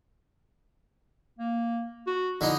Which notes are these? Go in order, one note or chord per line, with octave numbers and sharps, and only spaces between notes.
A#3
F#4
D3 D#4 E4